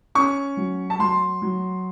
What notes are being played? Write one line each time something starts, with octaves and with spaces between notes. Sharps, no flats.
C#4 C#6
F#3
A5
F#3 C6
F#3